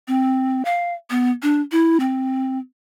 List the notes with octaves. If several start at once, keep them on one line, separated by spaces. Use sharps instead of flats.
C4
F5
B3
D4
E4
C4